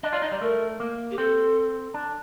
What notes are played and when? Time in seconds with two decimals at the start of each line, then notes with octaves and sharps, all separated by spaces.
0.03 D4 D#5
0.13 F4 D5
0.22 D#4 D#5
0.32 G3 D5
0.41 A3 A#4
0.80 A#3
1.11 G4
1.18 C4 A4
1.94 D4